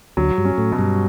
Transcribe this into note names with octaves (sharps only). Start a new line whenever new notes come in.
D2 D3 F#3
G2 G3
C#4
A2 A3
B2
G2 G3